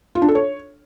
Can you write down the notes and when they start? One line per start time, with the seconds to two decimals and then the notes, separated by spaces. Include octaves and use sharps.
0.15 F4
0.22 D4
0.28 A4
0.35 C#5